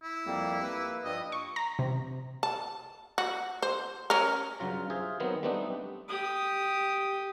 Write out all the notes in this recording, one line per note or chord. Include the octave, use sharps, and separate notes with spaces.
E4
F2 G3 A#3
A#3 B4
G2 F3 G3 D#5
C#6
A#5
C3
A5
F#4
C5
C#4 A#4
G2 C#3 F#3 F4 A#5
F4 G#4 C5 E5
D#3 F#3 B3 C4
G3 A3 B3 C4 D4 D#4
G4 D#6